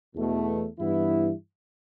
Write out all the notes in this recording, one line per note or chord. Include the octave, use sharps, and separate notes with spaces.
E2 B2 A3
G2 E3 B3 E4